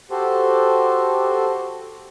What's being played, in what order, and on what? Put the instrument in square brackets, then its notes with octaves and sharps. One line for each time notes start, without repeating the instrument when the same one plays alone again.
[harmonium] F#4 G4 A4 C5